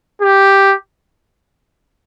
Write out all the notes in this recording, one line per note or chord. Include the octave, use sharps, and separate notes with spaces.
G4